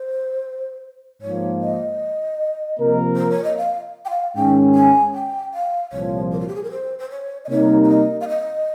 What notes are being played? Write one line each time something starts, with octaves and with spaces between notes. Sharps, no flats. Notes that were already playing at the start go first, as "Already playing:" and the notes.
Already playing: C5
G#2 F3 A#3 C#5
D#5
C3 F3 A#3 F4 A#4
C5
C#5
D#5
F5
G5
F5
G#2 D#3 G#3 C#4 G5
G#5
G5
F5
C2 A#2 F3 C#5
A#4
F4
G4
G#4
A#4
C5
C5
C#5
D#5
C3 G3 A#3 D#4 A#4 C#5
C#5
D#5
F5
D#5